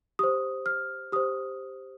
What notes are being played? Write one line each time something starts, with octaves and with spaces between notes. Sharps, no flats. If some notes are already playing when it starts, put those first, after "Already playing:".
G4 C5 D#6
F6
G4 C5 D#6